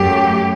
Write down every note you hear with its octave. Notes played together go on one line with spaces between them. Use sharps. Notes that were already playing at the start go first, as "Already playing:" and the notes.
Already playing: F#2 F#3 A3 G4